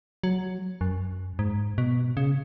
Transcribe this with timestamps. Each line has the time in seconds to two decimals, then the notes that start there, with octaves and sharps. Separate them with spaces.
0.24 F#3
0.81 F#2
1.39 G#2
1.78 B2
2.17 C#3